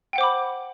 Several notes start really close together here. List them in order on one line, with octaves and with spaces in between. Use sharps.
G5 F#5 C5 D6 B5